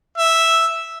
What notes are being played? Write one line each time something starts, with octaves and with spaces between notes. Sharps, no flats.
E5